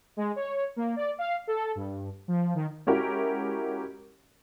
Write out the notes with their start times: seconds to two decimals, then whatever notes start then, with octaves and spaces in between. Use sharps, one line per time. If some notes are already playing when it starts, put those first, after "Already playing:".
0.17 G#3
0.36 C#5
0.76 A#3
0.96 D5
1.18 F5
1.47 A4
1.75 G2
2.28 F3
2.55 D#3
2.87 G#3 C#4 E4 F#4 G4 A#4